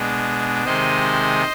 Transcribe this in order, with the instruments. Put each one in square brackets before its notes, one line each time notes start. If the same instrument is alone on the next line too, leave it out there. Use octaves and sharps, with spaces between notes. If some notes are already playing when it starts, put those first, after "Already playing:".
Already playing: [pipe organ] B2 G#3 D4
C3 D#3 G#3 C5 D#5